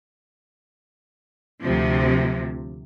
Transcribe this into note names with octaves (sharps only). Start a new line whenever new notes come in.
D2 C3 F3